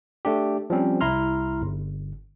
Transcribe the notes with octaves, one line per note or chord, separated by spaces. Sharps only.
A3 D4 G4
F3 G3 C4 C#4
C2 E4 A#5 C6 F6
G1